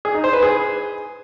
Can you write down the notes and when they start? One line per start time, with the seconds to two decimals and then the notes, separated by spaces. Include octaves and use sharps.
0.05 G#4
0.14 D#4
0.24 C5
0.33 B4
0.43 G#4